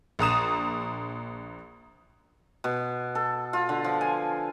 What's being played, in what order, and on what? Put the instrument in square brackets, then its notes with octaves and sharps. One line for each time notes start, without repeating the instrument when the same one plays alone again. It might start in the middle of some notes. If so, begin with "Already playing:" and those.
[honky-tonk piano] A#1 A#5 D#6 E7
[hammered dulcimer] B2
A4
F4
D3
F3
G#5